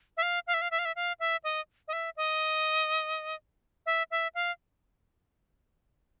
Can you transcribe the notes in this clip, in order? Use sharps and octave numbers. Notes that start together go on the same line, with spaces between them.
E5
F5
F5
E5
F5
E5
F5
E5
F5
E5
D#5
D#5
E5
D#5
E5
E5
F5